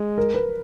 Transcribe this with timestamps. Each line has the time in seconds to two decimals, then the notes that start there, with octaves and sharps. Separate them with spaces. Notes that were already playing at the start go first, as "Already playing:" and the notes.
Already playing: G#3
0.18 A#4
0.34 B4